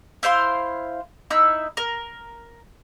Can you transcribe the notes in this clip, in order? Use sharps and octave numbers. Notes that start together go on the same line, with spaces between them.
E4 C5 F5 C6
D#4 E4 E6
A#4